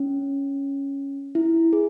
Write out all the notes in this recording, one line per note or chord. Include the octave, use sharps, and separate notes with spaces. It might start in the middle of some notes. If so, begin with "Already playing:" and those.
Already playing: C#4
E4
G#4